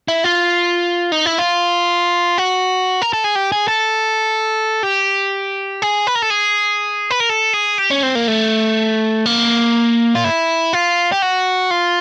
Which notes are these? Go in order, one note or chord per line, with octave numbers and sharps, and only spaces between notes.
E4
F4
D#4
E4
F4
F#4
A#4
A4
G#4
G4
G#4
A4
G4
G#4
B4
A#4
A4
G#4
B4
A#4
A4
G#4
G4
C#4
C4
A#3
A3
A#3
F4
E4
F4
G4
F#4
F4